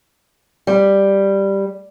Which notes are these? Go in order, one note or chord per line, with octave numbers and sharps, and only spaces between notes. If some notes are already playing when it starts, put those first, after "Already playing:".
G3